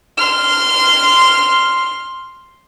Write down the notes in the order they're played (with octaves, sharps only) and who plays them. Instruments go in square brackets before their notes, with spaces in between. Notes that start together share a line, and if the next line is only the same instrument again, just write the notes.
[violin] C6 F6